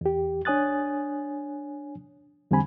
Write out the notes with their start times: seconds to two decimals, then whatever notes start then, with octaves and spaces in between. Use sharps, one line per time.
0.01 E2 G4
0.45 D4 C#5 G#5 D#6 F#6 A6
2.51 E2 D3 G3 C4 G#5 B5